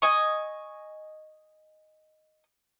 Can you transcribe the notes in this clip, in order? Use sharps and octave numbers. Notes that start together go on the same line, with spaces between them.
D#5 G#5 C#6